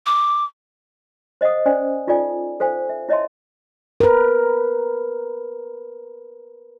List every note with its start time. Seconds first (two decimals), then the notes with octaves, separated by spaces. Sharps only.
0.06 D6
1.41 C5 D#5 F5 F#5 D#6
1.66 C#4 C5 D5 G#5
2.07 D#4 F4 A4 D5 G#5
2.60 A4 C5 F5 G#5
2.89 E5
3.09 E4 C#5 D#5 E5 A5 C6
4.00 A#4 B4